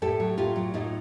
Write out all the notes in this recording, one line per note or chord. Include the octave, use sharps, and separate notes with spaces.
A2 G4 A4
F#3
A2 F4 G4
F#3
A2 D#4 F4